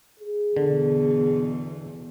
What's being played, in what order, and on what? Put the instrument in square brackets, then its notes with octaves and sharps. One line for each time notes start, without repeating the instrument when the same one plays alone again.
[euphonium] G#4
[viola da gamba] E2 B2 [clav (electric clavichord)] D3